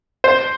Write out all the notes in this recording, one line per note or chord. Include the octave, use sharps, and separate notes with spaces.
C5